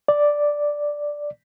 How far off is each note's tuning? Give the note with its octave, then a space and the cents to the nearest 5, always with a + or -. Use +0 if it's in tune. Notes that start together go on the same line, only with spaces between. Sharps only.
D5 +0